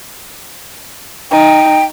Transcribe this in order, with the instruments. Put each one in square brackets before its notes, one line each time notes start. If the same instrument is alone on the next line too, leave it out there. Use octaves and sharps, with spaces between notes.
[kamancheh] D#4 [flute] G5